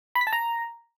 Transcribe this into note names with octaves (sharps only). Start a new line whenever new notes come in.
B5
B6
A5
A#5